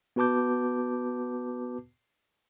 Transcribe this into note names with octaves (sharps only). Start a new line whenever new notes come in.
B3 F#4 B4 A5 D6 G6